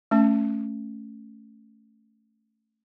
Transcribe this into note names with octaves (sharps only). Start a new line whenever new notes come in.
A3 C#4 A5